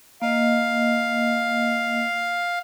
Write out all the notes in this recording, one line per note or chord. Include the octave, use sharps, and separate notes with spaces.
A#3 D#5 F5